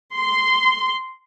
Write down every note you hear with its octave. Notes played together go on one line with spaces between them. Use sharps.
C6